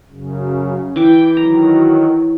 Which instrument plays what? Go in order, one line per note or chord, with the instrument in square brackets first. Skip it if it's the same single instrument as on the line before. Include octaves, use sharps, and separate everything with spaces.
[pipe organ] F#2 C#3
[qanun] E3 D6 [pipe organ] G5
[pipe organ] D#3 F#3 [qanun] A#5